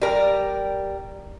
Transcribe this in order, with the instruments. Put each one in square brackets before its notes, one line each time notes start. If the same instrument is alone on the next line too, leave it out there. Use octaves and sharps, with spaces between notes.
[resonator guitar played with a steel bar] G3 A#4